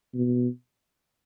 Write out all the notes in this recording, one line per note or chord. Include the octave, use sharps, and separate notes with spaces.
B2